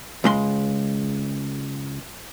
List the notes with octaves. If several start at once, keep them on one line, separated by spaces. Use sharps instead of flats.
C#2 G#3 C6